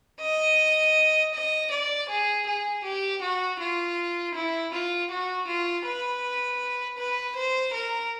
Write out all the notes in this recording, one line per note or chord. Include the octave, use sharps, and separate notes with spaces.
D#5
D#5
D5
G#4
G#4
G4
F#4
F4
E4
F4
F#4
F4
B4
B4
C5
A#4